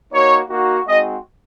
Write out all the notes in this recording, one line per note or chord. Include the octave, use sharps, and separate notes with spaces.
A#3 D#4 F#4 C#5
A#3 D#4 F#4
G#3 C4 D#4 F#4 D#5